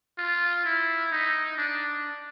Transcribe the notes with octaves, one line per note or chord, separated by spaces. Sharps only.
F4
E4
D#4
D4